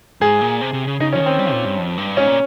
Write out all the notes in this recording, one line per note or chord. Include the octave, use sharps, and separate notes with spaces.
G#2 G#4
A#2
C3
C3
C#3
C#3 D#4
F3 C#4
D#3
C4
G3
A#2
G2
F2
G2
G#2 C#4
A#2